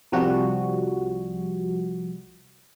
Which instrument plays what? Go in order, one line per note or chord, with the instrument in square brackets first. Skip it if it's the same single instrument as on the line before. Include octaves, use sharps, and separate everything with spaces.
[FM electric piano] C2 F3 G3 F#4